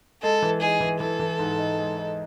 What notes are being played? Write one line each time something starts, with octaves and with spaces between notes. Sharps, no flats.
G#3 A4
E3
D#4 G#4
E3
E3 A4
E3
G#2
D#4
G#3
D#4